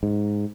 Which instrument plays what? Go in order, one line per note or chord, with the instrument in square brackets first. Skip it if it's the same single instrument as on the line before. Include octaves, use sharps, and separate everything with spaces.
[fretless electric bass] G#2